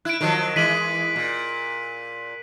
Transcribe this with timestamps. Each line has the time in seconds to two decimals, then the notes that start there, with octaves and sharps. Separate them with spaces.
0.05 E4 F#6 D7
0.21 D#3 F3 F#3
0.56 E3 G#3 B6 D#7 F#7
1.16 A#2